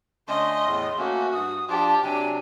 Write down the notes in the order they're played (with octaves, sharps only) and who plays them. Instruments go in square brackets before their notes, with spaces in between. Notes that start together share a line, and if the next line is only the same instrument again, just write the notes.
[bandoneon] D3 A3 C#4 [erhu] D#5 [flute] C6
[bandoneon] E2 A2
[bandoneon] A3 A#3 C#4 [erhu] F#4
[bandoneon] G2 [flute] D#6
[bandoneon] F3 D4 F4 [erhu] G4 [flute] A5
[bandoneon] C3 F#3 D4 [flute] G#5